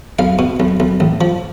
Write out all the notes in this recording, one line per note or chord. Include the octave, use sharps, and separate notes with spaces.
B1 F5
B2
B1
B1
A1
F3